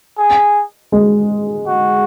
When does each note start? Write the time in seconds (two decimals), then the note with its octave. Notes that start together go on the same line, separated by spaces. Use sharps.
0.18 G#4
0.92 G#3
1.67 F#4